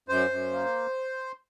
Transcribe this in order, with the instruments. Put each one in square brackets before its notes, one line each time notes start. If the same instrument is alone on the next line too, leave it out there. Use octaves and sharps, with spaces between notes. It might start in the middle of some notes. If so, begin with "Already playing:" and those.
[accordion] F#2 C5
F#2
A#3